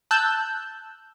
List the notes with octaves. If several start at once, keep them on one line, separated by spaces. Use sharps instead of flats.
A5 E6 F#6 G6